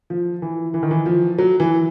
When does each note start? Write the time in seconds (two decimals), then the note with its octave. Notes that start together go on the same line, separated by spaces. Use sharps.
0.10 F3
0.42 E3
0.74 E3
0.83 D#3
0.91 E3
1.06 F3
1.38 F#3
1.60 E3